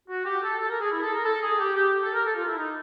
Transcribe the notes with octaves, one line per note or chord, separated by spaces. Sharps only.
F#4
G4
A4
A4
A#4
G#4
E4
A4
A#4
A4
G#4
G4
G4
A4
A#4
A4
F4
E4
D#4